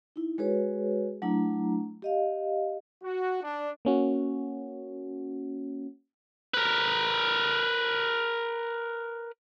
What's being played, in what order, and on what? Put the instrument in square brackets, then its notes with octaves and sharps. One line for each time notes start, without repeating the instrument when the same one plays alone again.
[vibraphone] D#4 E4
G#3 F#4 G#4 B4 C#5
F#3 A3 D4 E4 A#5
G4 D#5 F5
[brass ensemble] F#4
D4
[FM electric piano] A#3 C#4 F#4
[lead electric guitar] A#4 B4